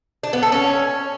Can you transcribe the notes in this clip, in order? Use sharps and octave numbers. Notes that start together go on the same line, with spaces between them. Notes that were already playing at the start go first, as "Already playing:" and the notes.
D4
B3
A4
C#4